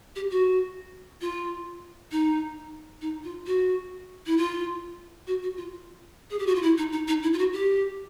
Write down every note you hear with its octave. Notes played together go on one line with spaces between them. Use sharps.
G4
F#4
F4
D#4
D#4
F4
F#4
E4
F4
F#4
F#4
F4
G#4
G4
F#4
F4
E4
D#4
D#4
D#4
E4
F4
F#4
G4